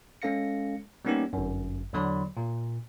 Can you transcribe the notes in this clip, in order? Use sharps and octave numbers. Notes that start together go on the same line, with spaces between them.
G#3 C#4 A4 F5 A#6 C#7
G3 A#3 B3 C#4 D#4 G4
G1 F#2
E2 D3 F#3 D5 B5 C6
A#2